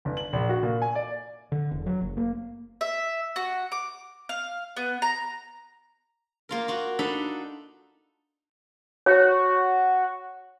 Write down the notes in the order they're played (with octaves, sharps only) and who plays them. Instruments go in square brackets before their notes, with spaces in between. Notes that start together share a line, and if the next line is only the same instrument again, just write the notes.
[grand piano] G1
F#7
A#1
F#4
A#2
G#5
D5
[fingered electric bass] D3
E1
F#3
F#1
A#3
[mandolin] E5
F#4
D6
F5
B3
A#5
[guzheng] A#3 F4 A#4
F4 F#4
D4 D#4 A4 B5
[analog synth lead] F#4 [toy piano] C#5